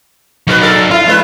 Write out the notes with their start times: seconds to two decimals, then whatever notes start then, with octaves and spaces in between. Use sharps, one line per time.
0.47 F#3 D#4 F#4 A#4 B4
0.61 A4 A#4 D5
0.91 E4 F4
1.06 F2 G#3 B4